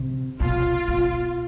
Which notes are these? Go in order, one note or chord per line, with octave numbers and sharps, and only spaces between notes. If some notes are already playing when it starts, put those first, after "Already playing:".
Already playing: C3
B2 F4
B2